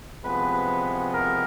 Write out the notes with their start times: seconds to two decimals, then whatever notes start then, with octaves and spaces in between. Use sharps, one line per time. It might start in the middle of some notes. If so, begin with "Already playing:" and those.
0.24 C2 C3 F3 G#3 B3 B4
1.14 A#4